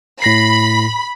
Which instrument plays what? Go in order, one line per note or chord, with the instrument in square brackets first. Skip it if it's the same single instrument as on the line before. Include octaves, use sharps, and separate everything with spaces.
[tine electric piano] A2 A#6 C7 [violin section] B5